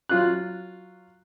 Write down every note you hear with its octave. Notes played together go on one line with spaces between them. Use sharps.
F#3 F4 F#6